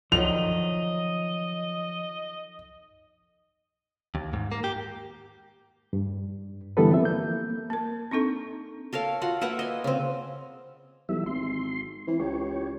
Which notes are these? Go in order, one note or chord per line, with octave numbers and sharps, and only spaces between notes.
D3 D#3 F3 F#3 D#5 F7
D#2
G#2
A#3
G4
G2
D3 E3 G3 B3 A4 B4
F3 C4 E5
A#3 G6
A#3 A#4
C4 D4 D#4 A4
A4 A#4 C#5 F5
F4 F#4 F#5
A#3 B4 E5 F#5
D#5 G#5
C#3 C4
B1 E3 G3 E5
G#1 C6
E3 C4
C#2 G4 C#5